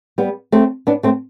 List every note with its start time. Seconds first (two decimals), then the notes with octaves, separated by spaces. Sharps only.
0.18 G3 B3
0.52 A3 C4
0.87 B3 D4
1.03 A3 C4